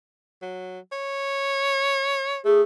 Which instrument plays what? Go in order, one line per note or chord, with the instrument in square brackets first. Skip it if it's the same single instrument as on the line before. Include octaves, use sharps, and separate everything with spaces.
[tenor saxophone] F#3
C#5
[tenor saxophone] A3 [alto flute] G#4